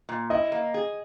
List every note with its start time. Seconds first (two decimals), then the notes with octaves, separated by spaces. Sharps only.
0.09 A#2
0.30 E4 D#5
0.52 A#3
0.74 G#4